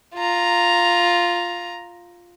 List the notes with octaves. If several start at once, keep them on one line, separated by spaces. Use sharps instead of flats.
F4 A#5